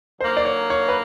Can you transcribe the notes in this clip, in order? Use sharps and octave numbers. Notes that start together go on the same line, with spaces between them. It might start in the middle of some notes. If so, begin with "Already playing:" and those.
D3 F#3 A#3 D#4 C5
D5
C#5
C#5
B4